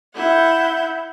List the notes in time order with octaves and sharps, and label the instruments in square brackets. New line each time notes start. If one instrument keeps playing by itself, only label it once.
[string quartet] E4 F#5 G6